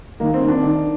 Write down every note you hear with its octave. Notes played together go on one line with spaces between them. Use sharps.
D#3 A#3
C4
D#3
D4
D#3